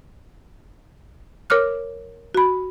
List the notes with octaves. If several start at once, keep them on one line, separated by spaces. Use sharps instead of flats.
A#4 C#5 D6 F6 F#6
F#4 B5